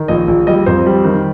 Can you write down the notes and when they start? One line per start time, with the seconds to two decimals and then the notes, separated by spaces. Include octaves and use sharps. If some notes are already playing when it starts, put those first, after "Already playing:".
Already playing: D#3
0.08 A#1 D#5
0.28 A#1
0.47 G3 D#5
0.66 F2 C5
0.86 G3
1.05 D#3